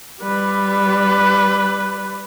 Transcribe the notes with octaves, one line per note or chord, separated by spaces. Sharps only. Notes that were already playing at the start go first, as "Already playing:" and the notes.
G3 B4